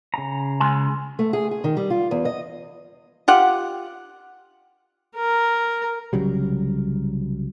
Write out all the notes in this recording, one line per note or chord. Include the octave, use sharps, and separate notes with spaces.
C#3 A#5
C#2 G#5 C6
A3
G#4
G#4
D#3
G3
F4
E2
D#5
F4 G4 F#5
A#4
C2 C#3 F#3 G3